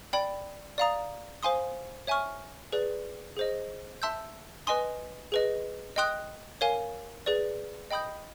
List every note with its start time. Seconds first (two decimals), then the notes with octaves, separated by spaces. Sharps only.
0.13 D5 G5 B5
0.78 D5 F5 A#5 D#6
1.43 C5 F5 G#5 C6 D#6
2.07 C#5 E5 G#5 C#6 F6
2.72 G#4 B4 D5
3.37 G#4 C5 D#5
4.02 E5 A5 C6 E6 G6
4.67 B4 D#5 G#5 C6 D#6
5.32 G#4 B4 D#5
5.96 D#5 G5 C6 D#6 F#6
6.61 A#4 C#5 F5 G#5
7.26 G#4 B4 D5
7.91 D#5 G5 B5 D#6 G6